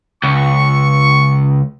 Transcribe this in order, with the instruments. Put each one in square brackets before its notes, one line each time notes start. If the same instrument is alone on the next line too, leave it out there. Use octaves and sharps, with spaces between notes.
[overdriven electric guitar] C#2 [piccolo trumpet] C#6